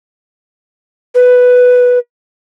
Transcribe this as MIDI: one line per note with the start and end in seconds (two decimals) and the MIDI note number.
1.15 1.99 71